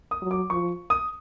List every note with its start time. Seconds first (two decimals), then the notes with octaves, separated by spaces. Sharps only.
0.11 D#6
0.22 F#3
0.31 D6
0.50 F3 C#6
0.90 D#6